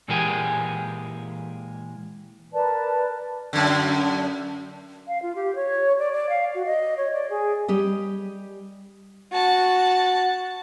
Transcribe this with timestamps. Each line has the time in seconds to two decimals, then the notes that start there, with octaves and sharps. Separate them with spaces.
0.08 A#2 E3 G#3 A#3 G4 G#4
2.53 A#4 B4 D5 A5
3.53 F#2 D3
5.08 F5
5.22 F4
5.35 G4
5.55 C#5
5.99 D5
6.13 D5
6.30 F5
6.55 F#4
6.66 D#5
6.97 C#5
7.13 D5
7.30 G#4
7.68 G3 G4 D#5
9.32 F#4 A5